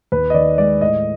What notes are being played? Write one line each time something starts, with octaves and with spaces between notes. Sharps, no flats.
D#2 B4
D#5
D#3 D5
G#3 D5
A2 D#5